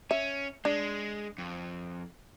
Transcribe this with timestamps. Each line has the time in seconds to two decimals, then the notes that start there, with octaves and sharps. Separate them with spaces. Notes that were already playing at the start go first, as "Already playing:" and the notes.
0.11 C#4 E5
0.65 G#3 D4
1.38 F2